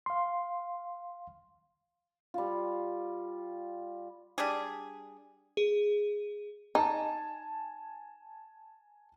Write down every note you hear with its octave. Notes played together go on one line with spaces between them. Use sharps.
F5 C6
G3 F4
G3 D4 G#4
G#4
D#4 G#5 A5